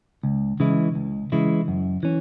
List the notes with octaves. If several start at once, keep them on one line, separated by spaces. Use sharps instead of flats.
C#2
C#3 E3 G#3 E4
C#2
C#3 E3 G#3 E4
F#2
E3 C#4